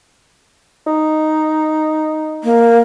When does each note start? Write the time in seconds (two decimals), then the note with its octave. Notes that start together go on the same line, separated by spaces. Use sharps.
0.87 D#4
2.44 A#3